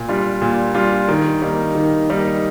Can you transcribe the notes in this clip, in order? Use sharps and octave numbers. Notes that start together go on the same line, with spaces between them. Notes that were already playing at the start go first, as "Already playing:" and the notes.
Already playing: A#2
G3 D4 F4
A#2
G3 D4 F4
D#3
G3 A#3 D#4
D#3
G3 A#3 D#4